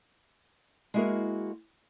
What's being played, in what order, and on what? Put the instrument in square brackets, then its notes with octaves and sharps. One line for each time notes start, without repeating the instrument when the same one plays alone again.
[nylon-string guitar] G#3 A#3 E4 F#4 G#4 A#4